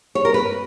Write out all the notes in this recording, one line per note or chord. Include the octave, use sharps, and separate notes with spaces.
C#5
A#4
B4